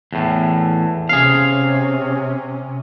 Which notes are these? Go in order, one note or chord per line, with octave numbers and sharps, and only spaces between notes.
E2 A2
C3 C#4 G#4 F5